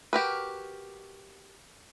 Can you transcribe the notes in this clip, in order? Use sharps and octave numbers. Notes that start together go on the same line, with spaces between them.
F#4 G4 A#4 B4